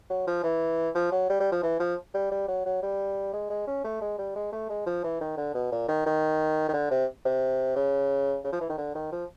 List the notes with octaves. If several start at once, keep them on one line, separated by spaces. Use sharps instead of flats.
F#3
F3
E3
F3
F#3
G3
G3
F3
E3
F3
G3
G3
F#3
F#3
G3
G#3
G#3
C#4
A3
G#3
G3
G#3
A3
G#3
F3
E3
D#3
D3
B2
A#2
D#3
D#3
D#3
D3
C3
C3
C#3
C#3
F3
E3
D#3
D3
D#3
F3